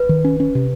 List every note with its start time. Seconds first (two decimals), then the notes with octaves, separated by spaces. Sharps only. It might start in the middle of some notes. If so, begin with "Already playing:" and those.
Already playing: B4
0.09 D#3
0.24 C#4
0.40 C#4
0.55 C3